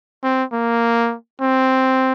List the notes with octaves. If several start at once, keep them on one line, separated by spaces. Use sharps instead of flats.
C4
A#3
C4